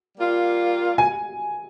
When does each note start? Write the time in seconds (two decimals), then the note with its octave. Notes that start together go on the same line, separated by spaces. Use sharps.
0.17 G3 A#3 F4
0.98 G#5